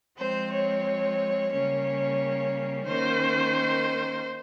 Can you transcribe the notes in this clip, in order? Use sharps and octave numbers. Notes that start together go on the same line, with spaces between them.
F3 G#3 C4 C5
C#5
C#3 G3 A#3 C#4 C#5
D#3 A#3 C#4 C5